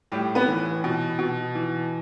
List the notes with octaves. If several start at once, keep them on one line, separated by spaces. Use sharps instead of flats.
A2 G3 G4
B3 B4
E3
B2
B2
E3